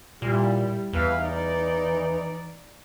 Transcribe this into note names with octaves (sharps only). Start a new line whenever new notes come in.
A#2 G3 E4
E2 E3 B4 F5
D#4 D5